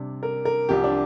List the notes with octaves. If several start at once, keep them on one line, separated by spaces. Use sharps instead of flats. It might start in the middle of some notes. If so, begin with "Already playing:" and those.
Already playing: C3 G3 D4
A#4
A#4
C2 C3 F3 G4
D4